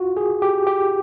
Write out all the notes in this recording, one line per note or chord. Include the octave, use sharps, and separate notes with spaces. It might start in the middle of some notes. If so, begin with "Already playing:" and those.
Already playing: F4 F#4
G#4
G4
G4